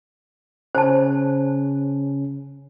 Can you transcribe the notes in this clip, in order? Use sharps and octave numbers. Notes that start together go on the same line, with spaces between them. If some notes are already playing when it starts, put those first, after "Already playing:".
C#3 C#4 C5 A5